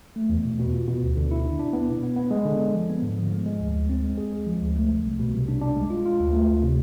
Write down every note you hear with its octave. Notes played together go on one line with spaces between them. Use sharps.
A3
E2
B2
B2
F4
B2
D2
D3
E4
D4
D4
B3
B2
B3
B3
G#3
D3
D3
F3
B3
G#2
F3
G#3
G#3
D2
D2
C4
G#3
G#4
G#3
F3
D2
A3
C2
C2
B2
C2
D4
D4
G#3
F4
F4
D2
A3
D2
C3